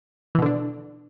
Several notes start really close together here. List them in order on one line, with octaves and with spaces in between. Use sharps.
E3 B2 D3 D4